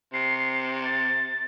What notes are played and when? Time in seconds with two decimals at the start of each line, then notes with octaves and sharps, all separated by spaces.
0.13 C3 C7
0.84 A6